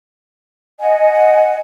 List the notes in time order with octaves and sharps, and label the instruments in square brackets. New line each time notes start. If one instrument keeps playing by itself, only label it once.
[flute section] D#5 F#5 G#5